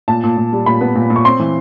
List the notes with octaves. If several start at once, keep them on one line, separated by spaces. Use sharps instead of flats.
A#2 A5
A#2
A#2
G3
A#2 B5
B3
A#2
A#2
C#6
C4 C6
E3